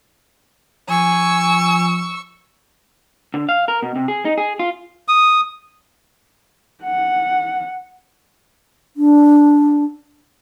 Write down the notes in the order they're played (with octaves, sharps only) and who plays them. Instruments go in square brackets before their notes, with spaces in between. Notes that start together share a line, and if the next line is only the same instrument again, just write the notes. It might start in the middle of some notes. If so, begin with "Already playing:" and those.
[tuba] F3 [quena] G#5 [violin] C#6 E6
[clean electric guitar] D3
F5
A#4
B2
C3
G#4
D#4
G#4
F4
[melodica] D#6
[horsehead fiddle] F#5
[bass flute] D4